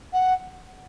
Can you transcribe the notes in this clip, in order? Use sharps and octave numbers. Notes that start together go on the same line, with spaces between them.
F#5